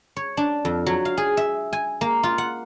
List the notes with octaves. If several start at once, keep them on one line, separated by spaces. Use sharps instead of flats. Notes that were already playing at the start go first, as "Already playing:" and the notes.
C#5
D4
F2
F#3
F5
G#4
E5
G#5
A#3
F4
F#5